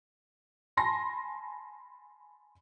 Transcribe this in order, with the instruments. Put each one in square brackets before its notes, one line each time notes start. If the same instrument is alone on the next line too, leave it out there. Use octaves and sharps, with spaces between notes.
[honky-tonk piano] G#5 A5 B5 C6 A#6